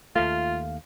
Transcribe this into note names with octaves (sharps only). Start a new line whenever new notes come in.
D#2 A3 F4 F5